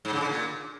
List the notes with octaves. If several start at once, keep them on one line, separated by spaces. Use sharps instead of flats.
G#2
C#3
D3
A#2